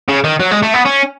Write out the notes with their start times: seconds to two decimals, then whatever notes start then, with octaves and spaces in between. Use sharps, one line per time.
0.09 C#3
0.24 D#3
0.40 F#3
0.51 G#3
0.63 A3
0.74 B3
0.86 C#4